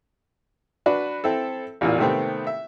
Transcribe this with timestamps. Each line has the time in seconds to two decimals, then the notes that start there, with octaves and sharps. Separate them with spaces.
0.86 D4 F#4 B4
1.24 C4 E4 A4
1.81 A1 E2 A#2
1.98 C3 D#3 A3 B3 C4
2.47 E5